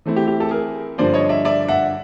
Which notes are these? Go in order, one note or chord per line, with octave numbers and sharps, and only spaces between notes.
E3 A3 C4 E4
G4
G4
G4 A4
G#4 A#4
G2 D3 F3 A#3 C5 D5
C#5 D#5
D5 E5
D5 E5
E5 F#5